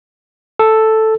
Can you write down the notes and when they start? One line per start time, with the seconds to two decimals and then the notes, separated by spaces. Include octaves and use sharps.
0.59 A4